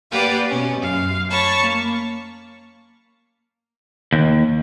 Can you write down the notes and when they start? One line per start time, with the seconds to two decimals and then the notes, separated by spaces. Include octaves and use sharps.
0.11 A#3 G4 B4 D5 F5 F#5
0.49 B2 C#4
0.81 F#2 F5
1.30 C#5 A5 B5 C#6
1.60 A#3
4.13 D#2